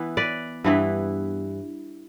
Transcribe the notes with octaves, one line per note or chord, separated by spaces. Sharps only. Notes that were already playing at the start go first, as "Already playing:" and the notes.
Already playing: E3 B3 E4
B4 D5
G2 E3 B3 E4